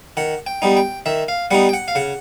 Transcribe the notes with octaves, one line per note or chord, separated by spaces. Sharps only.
D#3 F#5
G5
G3 B3 D#4
G5
D#3 E5
F5
G3 B3 D#4 F#5
G5
F#5
F5
C#3 F#5